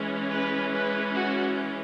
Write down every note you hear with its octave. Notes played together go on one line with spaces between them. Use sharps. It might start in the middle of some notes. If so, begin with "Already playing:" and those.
Already playing: E3 G#3 C#4
B4
B4
F#4